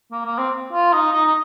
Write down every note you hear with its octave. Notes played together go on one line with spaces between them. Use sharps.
A#3
A#3
C4
F4
D#4
D#4
D#4